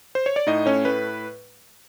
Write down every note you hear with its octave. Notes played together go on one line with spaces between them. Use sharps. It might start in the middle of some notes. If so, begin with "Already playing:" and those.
C5
C#5
D5
A2 D#4 D#5
A3 C#4 C#5
A2 B4